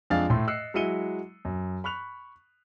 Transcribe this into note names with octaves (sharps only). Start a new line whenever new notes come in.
F2 G#3 D4 G#4 F5 A6
A2 A3 C6
D#5 E6 F#6 C7 C#7
F#3 G#3 E4 C#7 D#7 G7
F#2
B5 C#6 F#6 F7